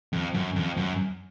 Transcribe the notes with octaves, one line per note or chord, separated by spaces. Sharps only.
F2
F#2
F2
F#2